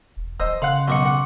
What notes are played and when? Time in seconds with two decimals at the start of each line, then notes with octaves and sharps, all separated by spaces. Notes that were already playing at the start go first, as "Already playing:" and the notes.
0.17 E1
0.40 D#1 C5 D#5 E6
0.62 C#3 F5 F#5 C6 F#6
0.87 B1 D#5 F#5 C#6 D6 C#7
1.05 F#5